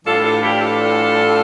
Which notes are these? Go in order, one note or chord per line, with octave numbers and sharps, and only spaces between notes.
A2 E3 G3 D4 F4 A4
F4 A4
E4 G4
F4 A4